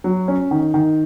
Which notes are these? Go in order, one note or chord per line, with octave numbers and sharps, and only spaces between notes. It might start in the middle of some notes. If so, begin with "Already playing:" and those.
F#3
C#4
D#3
D#3